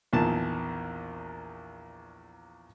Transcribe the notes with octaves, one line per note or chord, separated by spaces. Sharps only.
A#1 E2 D#3 A5